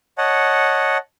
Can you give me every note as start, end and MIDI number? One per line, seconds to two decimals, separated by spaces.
0.18 0.97 73
0.18 0.97 75
0.18 0.97 78
0.18 0.97 81